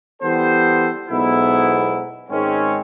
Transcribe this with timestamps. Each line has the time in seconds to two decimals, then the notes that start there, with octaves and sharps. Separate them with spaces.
0.22 E3 G3 B3 A4 C5
1.09 B1 G#2 B3 E4
2.30 G#2 D#3 G#3 C4 C#4